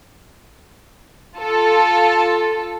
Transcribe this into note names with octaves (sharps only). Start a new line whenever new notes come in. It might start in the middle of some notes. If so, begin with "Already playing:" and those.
F4 A4